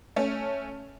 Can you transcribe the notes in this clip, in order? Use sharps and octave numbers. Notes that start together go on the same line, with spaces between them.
A3 C#4